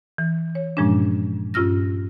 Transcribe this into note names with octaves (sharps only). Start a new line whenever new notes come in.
E3
C#5
G2 A#2 F3 G#3 C#4 D4
G2 C#4 F4 E6 F6 A#6